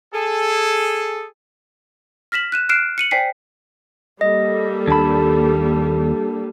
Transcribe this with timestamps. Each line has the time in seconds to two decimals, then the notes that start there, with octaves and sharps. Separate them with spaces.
0.14 G#4 A4
2.32 F6 A#6 B6 E7 F#7
2.52 F#6 D#7 E7
2.69 F6 F#6 C7 D7 E7
2.98 C#7 D#7 F#7
3.11 C5 D5 G5 G#5 B6 C7
4.21 G3 A#3 A4 D#5
4.88 D#2 D4 A5 B5